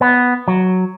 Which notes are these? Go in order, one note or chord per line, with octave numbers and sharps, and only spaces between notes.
B3
F#3